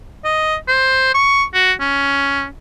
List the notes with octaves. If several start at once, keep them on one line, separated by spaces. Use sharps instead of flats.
D#5
C5
C#6
F#4
C#4